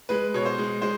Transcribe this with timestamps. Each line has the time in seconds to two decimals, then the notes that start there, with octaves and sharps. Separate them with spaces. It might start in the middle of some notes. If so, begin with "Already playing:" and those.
0.09 G#3 B4
0.34 B2 C#5
0.45 C5
0.58 G#3
0.81 G#3 C5